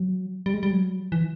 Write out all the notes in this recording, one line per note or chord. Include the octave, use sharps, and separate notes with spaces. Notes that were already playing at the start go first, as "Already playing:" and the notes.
Already playing: F#3
G3
G#3
G3
F#3
E3